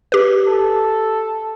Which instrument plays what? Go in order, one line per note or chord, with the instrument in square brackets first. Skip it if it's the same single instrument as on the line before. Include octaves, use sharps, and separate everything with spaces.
[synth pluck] G4 B4
[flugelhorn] A4